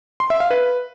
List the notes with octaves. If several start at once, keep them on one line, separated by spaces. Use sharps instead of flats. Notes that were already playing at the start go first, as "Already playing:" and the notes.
C6
E5
F5
B4